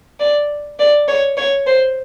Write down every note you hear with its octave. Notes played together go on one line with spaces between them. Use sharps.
D5
D5
C#5
C#5
C5